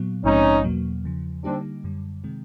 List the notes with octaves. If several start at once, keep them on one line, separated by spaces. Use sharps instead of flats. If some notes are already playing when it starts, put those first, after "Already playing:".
Already playing: A#2 F#3 B3
A#1 G#2 F3 G#3 C4 C#4 D#4
E2 B2 F#3 A#3
E2 C#3 F3
D3 G3 A#3 C4 D4 D#4 G4
F#2 D3 G3
C3 D#3 G#3 C4